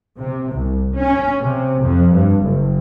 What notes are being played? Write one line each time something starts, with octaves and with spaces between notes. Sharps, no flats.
C3
C2
C#4
C3
F2
G2
F#1